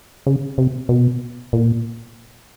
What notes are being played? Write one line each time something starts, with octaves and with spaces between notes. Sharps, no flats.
C#3
C3
B2
A#2